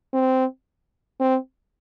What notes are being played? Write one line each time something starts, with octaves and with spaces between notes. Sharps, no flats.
C4
C4